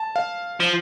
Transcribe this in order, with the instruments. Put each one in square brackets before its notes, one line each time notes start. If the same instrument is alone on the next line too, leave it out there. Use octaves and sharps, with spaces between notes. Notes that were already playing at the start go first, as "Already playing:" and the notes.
Already playing: [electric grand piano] A5
F5
[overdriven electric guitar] F3